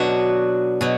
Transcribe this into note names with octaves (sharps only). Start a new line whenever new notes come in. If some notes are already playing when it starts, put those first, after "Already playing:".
Already playing: B2 F#3 B3 D4 F#4
B2 F#3